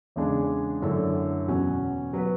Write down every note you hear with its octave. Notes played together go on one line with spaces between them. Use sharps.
E2 C#3 G#3 D4 G#4
F#2 D3 A3 E4 A4
E2 B2 F#3 C#4 F#4
F#3 B3 F#4 B4